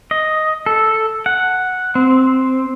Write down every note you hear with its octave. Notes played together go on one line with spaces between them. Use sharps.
D#5
A4
F#5
C4